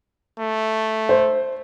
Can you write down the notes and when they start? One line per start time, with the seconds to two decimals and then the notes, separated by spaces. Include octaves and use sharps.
0.39 A3
1.09 C5